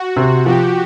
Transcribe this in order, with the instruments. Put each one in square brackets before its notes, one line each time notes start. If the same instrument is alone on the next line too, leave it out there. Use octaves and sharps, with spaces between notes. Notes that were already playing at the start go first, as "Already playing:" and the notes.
Already playing: [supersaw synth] F#4
[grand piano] C3
[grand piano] F3 [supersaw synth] G4